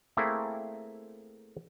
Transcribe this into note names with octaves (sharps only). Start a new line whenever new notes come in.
A3 A#3 C4 E4 G#4